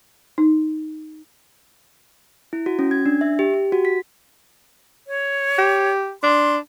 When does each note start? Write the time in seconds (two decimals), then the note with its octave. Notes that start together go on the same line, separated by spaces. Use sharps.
0.38 D#4
2.53 E4
2.66 F#4
2.79 C#4
2.91 G#6
3.06 D4
3.21 E5
3.39 G4
3.54 G4
3.72 F#4
3.85 B6
5.07 C#5
5.58 G4
6.23 D4 C6